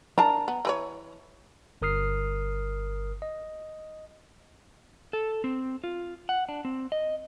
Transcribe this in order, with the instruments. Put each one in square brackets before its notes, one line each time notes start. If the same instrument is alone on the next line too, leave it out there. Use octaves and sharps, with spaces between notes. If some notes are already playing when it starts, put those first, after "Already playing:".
[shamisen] D4 A#4 A5 [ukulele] A#5
[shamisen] B3
E3 B4 C#5
[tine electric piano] G1 A#4 D#6 F6 C7
D#5
[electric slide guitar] A4
C4
F4
F#5
D4
C4
D#5